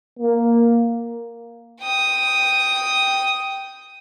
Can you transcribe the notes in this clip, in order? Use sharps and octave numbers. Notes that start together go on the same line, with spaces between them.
A#3
G5 D#6